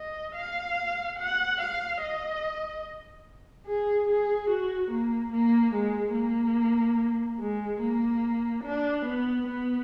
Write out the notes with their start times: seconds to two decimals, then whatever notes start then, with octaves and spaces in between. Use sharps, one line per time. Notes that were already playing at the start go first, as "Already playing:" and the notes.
Already playing: D#5
0.36 F5
1.19 F#5
1.60 F5
2.02 D#5
3.67 G#4
4.09 G#4
4.50 F#4
4.91 A#3
5.33 A#3
5.74 G#3
6.15 A#3
7.40 G#3
7.82 A#3
8.64 D4
9.06 B3
9.48 B3